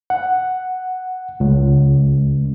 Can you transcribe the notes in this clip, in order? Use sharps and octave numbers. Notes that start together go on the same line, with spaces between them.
F#5
C#2